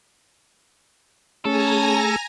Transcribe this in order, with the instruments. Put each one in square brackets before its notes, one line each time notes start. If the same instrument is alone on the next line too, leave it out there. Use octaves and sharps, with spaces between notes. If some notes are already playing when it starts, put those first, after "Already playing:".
[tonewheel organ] A3 G#4 [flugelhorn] C#4 [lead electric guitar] A4 [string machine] G#5 A#5 A#6